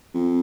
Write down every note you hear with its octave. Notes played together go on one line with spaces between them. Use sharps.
F2